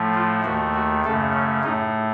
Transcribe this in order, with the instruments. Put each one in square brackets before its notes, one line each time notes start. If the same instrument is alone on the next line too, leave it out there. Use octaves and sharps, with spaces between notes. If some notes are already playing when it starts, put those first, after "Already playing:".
Already playing: [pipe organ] A2 F3 A3
F4
D#2 D#3 A3 F#4
F#4
F#2 C#3 A3 A4
C#4
A2 A3 D#4